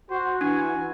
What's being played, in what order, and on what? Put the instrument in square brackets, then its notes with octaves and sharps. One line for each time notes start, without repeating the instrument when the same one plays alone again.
[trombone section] F#4 [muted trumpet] C5
[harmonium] E3 E4 [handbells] D4 [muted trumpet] G#5